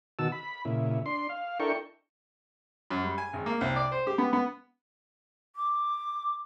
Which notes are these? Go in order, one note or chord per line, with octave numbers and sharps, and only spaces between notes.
B2 D#3 F#4 A5 E6
B5
A#2 C#3 E4
D4 C6
F5
D4 E4 A4 A#4 G5 C#6
F#2
G3
G#5
G#1
A#3
C2
D5
C5
G4
B3
B3
D6